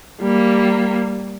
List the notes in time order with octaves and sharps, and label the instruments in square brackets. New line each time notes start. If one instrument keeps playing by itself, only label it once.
[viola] G3 A#3